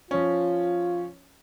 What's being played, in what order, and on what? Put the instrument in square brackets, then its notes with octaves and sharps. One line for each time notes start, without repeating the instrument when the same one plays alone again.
[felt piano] F3 C#4 [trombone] F4